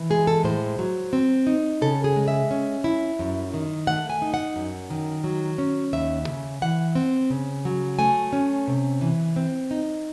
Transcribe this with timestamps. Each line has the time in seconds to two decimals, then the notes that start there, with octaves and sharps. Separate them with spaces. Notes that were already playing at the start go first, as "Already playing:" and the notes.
Already playing: E3
0.10 G#3 G#4
0.27 A4
0.44 A2 C5
0.79 F#3
1.13 C4
1.47 D#4
1.81 C#3 A4
2.04 G#4
2.16 G#3
2.28 E5
2.51 C#4
2.84 E4
3.19 F#2
3.54 D#3
3.87 A3 F#5
4.10 G#5
4.22 D#4
4.34 F#5
4.56 F#2
4.90 D#3
5.24 F#3
5.58 C#4
5.93 D#2 E5
6.27 C#3
6.62 E3 F#5
6.95 C4
7.30 C#3
7.65 F#3
7.99 A3 G#5
8.33 C#4
8.68 C3
9.01 E3
9.36 C4
9.71 D#4